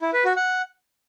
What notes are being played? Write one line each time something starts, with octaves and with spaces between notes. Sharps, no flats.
E4
B4
F#4
F#5